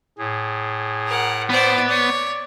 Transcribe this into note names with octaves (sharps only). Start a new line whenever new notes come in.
A2 G#4
A#4 F#5
B3 C5 D5
C#5 D5